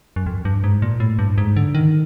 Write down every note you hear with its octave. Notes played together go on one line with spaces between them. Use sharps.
F#2
F2
G2
G#2
A#2
A2
G2
G#2
D3
D#3